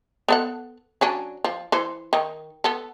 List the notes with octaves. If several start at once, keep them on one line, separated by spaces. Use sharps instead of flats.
B3 A4 F#5
F#3 C#4 D4
F3
E3 C5
D#3
B3 A4